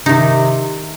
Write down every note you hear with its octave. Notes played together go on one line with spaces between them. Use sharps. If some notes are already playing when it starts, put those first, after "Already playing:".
C3 D#3 D#4